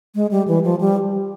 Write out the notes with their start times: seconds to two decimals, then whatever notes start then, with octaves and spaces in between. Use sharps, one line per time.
0.15 G#3
0.31 G3
0.48 E3
0.64 F3
0.81 G3